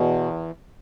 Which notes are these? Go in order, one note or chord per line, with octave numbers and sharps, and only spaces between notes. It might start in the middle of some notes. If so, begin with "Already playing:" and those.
Already playing: E2 B2